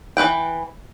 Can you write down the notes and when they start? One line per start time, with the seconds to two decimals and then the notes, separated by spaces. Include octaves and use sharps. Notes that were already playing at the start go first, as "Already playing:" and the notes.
0.17 E3 E4 B4 G5